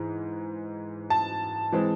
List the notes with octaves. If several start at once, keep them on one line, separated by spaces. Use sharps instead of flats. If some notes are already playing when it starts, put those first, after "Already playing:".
Already playing: G#2 E3
A5
E3 G#3 C4